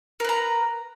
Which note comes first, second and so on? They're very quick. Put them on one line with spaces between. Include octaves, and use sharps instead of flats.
A#4 B4 A#5